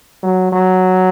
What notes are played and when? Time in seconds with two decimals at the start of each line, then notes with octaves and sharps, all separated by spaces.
0.23 F#3
0.52 F#3